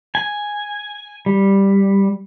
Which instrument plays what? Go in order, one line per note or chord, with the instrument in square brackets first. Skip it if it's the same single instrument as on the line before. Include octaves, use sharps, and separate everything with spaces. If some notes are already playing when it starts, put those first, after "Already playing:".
[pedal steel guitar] G#5
G3